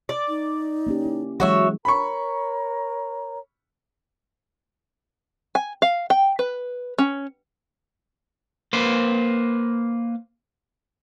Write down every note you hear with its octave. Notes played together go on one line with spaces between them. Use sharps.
D5
D#4
A#3 C#4 G4
E4
E3 F#3 G#3 F#4 C#5 E5
A#4 C#5 A#5 B5 C#6
G#5
F5
G5
B4
C#4
A#3 B4 C5